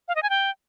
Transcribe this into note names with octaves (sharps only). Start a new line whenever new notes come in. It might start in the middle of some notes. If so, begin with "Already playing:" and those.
F5
D#5
G#5
G5